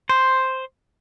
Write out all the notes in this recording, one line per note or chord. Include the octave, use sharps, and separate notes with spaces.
C5